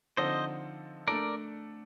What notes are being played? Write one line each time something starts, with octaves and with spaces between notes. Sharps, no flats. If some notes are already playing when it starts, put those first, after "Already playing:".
D3 F3 C4 D#4 A4 C5 D#5
A3 D4 A4 A#4 D5